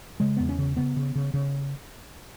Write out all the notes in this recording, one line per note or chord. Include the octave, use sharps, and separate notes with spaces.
C#3 G#3
E2 B3
C#4
C#3
C#3 B3
C#3
C#3
C#3